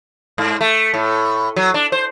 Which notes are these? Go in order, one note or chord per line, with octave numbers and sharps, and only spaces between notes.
G#2
A3
A2
F#3
D4
C5